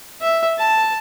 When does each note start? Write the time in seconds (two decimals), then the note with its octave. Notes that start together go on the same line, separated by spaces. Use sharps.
0.21 E5
0.58 A5